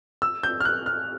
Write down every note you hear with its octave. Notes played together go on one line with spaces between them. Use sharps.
E6
G6
F6
F#6
F6